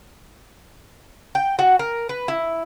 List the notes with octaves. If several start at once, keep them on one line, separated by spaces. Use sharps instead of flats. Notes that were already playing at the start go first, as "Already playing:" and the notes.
G5
F#4
A#4
B4
E4